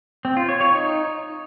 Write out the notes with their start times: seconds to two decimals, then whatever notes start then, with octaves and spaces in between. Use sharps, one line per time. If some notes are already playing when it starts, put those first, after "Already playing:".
0.25 C4
0.37 F4
0.49 C#5
0.61 C#5
0.73 D#4